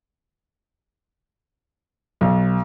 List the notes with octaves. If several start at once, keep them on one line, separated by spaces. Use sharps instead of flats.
B1